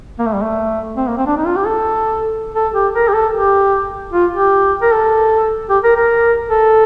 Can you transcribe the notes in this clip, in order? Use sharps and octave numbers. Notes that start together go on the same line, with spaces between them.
A#3
A3
G3
A3
C4
A#3
C4
D4
D#4
F4
G4
A4
A4
G4
A#4
G4
A4
G4
F4
G4
A#4
A4
G4
A#4
A#4
A4